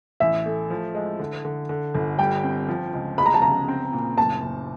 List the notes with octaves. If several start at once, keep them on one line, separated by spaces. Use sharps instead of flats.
A1 E5
A3
F3
G#3
D3
D3
D3
G1
G3 G5
C4
F3
C#2
G#3 B5
A#5
A5
C#3 A#5
C4
A#2
F#1 A5
F#1